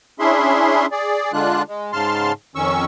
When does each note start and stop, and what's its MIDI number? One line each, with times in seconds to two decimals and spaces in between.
0.20 0.86 61
0.20 0.86 62
0.20 0.86 64
0.20 0.86 68
0.20 0.86 76
0.20 0.86 84
0.92 1.32 68
0.92 1.32 74
1.33 1.62 50
1.33 1.62 56
1.33 1.62 62
1.33 1.62 65
1.33 1.62 90
1.69 1.92 56
1.93 2.32 44
1.93 2.32 49
1.93 2.32 81
1.93 2.32 84
1.93 2.32 89
2.56 2.85 41
2.56 2.85 51
2.56 2.85 61
2.56 2.85 85
2.56 2.85 88